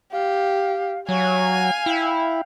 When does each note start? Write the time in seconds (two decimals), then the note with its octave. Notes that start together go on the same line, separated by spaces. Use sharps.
0.12 G4 F5
1.09 F#3 C#5 F5 G#5
1.86 E4 G5